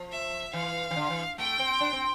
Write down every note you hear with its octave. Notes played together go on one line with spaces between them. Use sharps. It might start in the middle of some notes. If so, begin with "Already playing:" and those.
Already playing: F3
E5
E3 F5
E3
D3
E3
A3 G5
C4
D4
C4